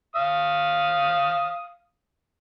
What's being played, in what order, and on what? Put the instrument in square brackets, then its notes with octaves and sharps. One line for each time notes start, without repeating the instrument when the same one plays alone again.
[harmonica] F5 D#6